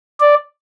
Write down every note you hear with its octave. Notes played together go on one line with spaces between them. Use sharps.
D5